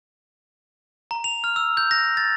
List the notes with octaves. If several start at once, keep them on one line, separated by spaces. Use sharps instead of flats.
A#5
F7
F6
E6
G6
A#6
A6